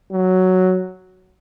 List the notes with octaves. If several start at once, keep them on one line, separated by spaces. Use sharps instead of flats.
F#3